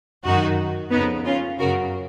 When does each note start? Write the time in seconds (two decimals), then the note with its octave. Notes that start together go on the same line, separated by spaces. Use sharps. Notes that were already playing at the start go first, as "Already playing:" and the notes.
0.24 F#2 D#3 D#4 F#4
0.91 F2 C#3 B3 D#4
1.25 C#4 F4
1.59 F#2 C#3 F#4 A#4